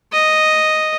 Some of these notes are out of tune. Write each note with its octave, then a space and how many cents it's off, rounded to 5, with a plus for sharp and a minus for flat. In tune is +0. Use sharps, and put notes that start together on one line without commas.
D#5 +0